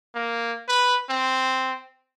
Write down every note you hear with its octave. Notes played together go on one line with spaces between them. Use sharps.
A#3
B4
C4